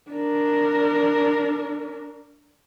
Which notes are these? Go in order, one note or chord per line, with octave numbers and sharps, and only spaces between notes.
D4 A#4